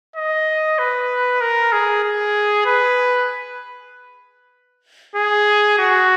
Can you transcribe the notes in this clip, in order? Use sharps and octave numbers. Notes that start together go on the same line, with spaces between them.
D#5
B4
A#4
G#4
G#4
B4
G#4
F#4